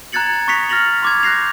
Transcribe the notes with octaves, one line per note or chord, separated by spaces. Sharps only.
A#5 F#6 G#6 A6 C#7 F#7
C#6 D#6 A#6 B6 C#7 F7
F6 A6 A#6 F7 F#7
C6 D6 G#6
F#6 G6 A#6 C7 F7